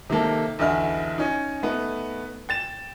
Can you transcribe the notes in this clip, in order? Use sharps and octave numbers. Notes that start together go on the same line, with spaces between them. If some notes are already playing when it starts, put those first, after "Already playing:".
C3 D#3 A#3 A4
B1 E2 D3 E4 F6
C#4 D#4
A3 B3 D#4
G5 A6 E7